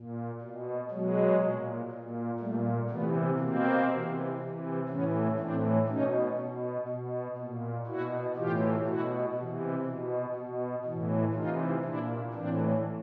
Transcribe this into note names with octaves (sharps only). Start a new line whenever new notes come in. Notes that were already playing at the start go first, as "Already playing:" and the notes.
Already playing: A#2
B2
B2 F#3 G#3
A#2
A#2
A#2 G3 A3
C3 E3 A3 B3
B2 A#3 C4
C3 E3
C3 E3
A2 E3 B3 C#4
A2 E3 C4 D4
B2 C#4 D#4
B2
B2
A#2
B2 E4 F#4
A2 E3 F4 G4
B2 E4 F#4
C3 E3
B2
B2
A2 E3
C3 E3 D#4 F4
A#2 D4 E4
A2 E3 C4 D4